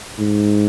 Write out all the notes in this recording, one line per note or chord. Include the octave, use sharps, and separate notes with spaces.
G#2